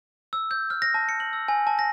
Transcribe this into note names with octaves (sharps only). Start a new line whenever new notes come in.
E6
G6
F6
A#6
A5
C#7
F#7
E6
G#5
A5
A#6